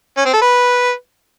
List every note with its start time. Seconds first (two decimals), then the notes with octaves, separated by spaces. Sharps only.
0.17 C#4
0.25 C4
0.33 A4
0.42 B4